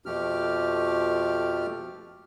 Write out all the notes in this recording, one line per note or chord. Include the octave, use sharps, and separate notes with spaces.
F2 B2 F3 A3 G4 F6